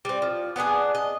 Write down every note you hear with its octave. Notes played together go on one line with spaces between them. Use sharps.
G3 C4
F3
B3 D4 G4 G#4
D#5